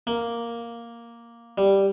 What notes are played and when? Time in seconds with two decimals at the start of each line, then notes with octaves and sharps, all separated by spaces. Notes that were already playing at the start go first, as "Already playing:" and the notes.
0.07 A#3
1.58 G3